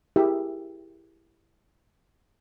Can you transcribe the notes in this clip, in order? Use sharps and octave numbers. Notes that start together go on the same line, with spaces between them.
E4 G4 G#4 A#4 E5